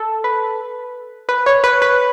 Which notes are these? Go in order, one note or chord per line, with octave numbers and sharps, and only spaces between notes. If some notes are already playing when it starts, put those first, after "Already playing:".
Already playing: A4
B4
B4
C#5
B4
B4